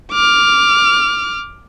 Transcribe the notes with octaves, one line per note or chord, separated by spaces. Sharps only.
D6 F6